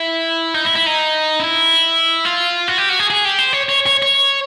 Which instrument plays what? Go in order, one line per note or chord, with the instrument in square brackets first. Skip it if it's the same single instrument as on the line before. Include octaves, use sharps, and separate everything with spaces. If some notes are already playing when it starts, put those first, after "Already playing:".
Already playing: [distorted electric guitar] E4
D#4
E4
E4
D#4
E4
F4
F#4
G4
F#4
G#4
G#4
G4
C5
C#5
C#5
C#5
C#5